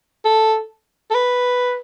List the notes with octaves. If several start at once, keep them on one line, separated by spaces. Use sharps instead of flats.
A4
A4
B4